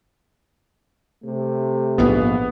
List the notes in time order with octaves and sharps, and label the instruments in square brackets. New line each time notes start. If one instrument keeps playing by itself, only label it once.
[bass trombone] C3 [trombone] A3
[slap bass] A#1 G#2 [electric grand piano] B3